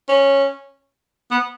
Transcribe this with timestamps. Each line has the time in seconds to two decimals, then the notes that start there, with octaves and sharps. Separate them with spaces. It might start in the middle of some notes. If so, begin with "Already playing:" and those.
0.09 C#4
1.31 B3